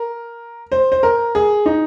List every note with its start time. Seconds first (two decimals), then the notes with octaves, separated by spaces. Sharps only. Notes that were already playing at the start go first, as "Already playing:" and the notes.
Already playing: A#4
0.72 C5
0.92 C5
1.03 A#4
1.35 G#4
1.66 D#4